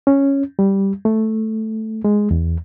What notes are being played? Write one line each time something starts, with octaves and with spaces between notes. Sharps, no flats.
C#4
G3
A3
G#3
E2